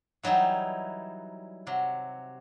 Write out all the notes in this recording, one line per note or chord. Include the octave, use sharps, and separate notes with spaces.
E3 F#3 G3 D#4 E4
C3 F#3